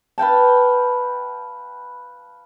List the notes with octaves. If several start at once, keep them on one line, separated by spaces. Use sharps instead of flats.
B4 F5 G5 A5